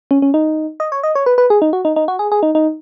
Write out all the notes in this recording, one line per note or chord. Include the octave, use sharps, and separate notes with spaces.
C#4
C#4
D#4
D#5
C#5
D#5
C#5
B4
B4
G#4
D#4
F#4
D#4
D#4
F#4
G#4
G#4
D#4
D#4